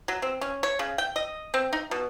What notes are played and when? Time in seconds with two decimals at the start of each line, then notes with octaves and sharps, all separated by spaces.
0.08 F#3
0.22 C4
0.41 C#4
0.63 C#5
0.79 C#3
0.98 G5
1.16 D#5
1.54 C4
1.73 D#4
1.91 B2